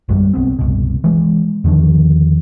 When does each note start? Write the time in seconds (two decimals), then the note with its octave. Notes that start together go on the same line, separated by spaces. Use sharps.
0.09 A#1 F#2 F#3 G3
0.34 B1 B3 C4
0.59 F#1 C2 B2
1.04 E3 G#3
1.64 E2 D3 D#3 F3